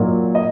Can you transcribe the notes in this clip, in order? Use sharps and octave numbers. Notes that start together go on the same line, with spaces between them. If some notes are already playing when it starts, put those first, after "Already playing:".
Already playing: A#2 F#3 A#3 D#4
D#5